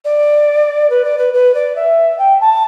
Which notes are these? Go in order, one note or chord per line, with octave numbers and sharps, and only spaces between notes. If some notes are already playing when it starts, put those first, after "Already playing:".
D5
B4
D5
B4
B4
D5
E5
G5
A5